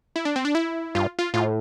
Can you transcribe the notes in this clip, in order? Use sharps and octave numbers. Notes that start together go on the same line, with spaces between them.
E4
D4
C4
D4
E4
G2 F4
F4
A2 F4